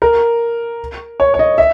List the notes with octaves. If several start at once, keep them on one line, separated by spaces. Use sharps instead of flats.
A#4
C#5
C#5
D#5
E5